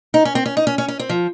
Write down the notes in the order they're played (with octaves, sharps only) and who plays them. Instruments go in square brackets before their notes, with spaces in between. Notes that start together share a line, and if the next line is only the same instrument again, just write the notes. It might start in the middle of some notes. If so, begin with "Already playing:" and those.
[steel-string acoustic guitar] D#4
C#4
C4
C#4
D#4
C#4
C#4
C#4
C4
F3